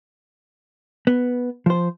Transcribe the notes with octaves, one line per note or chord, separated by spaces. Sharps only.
B3
F3 C5